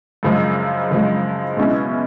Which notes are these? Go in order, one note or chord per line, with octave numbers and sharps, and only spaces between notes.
F#2 C#3 F3 G#3
F#2 C#3 F3 G#3
B2 G#3 C#4 E4